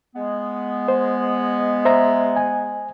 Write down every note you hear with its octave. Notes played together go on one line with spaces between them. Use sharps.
G#3 B3
C5
C5 E5 A#5
G#5